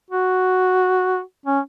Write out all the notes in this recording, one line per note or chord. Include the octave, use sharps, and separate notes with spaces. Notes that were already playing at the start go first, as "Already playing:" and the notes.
F#4
C#4